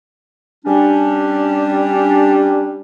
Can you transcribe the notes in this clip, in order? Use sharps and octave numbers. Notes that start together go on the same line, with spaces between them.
G3 C#4 D4